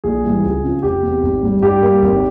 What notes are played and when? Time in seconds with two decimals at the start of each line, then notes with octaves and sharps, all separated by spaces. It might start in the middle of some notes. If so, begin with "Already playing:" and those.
0.04 A#1 G#4
0.24 G#2 E3 G3
0.44 C#2
0.64 C#3 F3
0.83 F1 G4
1.03 E2 C3
1.23 G#1
1.43 G#2 G3
1.62 G2 G4
1.81 G3 A#3
2.02 G#1